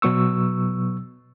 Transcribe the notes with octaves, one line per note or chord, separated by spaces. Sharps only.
B2 F#3 B3 C#6 E6